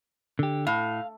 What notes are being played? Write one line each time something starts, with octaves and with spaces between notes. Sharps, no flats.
D3 G4
A2 F5